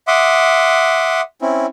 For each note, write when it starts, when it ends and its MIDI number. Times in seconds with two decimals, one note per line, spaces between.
0.08 1.21 76
0.08 1.21 78
0.08 1.21 84
0.08 1.21 86
0.08 1.21 87
1.42 1.66 60
1.42 1.66 61
1.42 1.66 64